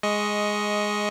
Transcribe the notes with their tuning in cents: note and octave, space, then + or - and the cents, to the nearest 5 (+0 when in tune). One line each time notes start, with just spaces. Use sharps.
G#3 +0 D#5 +10 C#6 +0